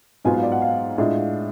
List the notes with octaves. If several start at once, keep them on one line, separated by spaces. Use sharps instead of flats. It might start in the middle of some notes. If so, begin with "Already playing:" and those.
G#2 F#3 B3 F4 G#5
F5
D5
F#5
F5
A2 G#3 D4 F4